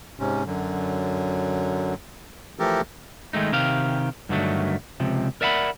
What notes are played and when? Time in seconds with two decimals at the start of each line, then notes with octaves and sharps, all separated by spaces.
0.20 G#2 C3 C#4
0.46 F#2 D3 F#3
2.59 E3 F3 A3 G4 A4 A#4
3.33 D#3 G#3 A3 D#4
3.52 C3 D#3 G4 F5
4.29 G2 D3 D#3 F#3 A3
5.00 C#2 C3 F3
5.41 A#4 D5 E5 F#5 G#5 B5